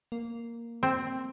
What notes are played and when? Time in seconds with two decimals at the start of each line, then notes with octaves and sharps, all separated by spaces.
0.12 A#3
0.83 C4